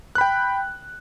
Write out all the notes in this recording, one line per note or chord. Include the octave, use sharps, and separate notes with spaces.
G5 B5 F#6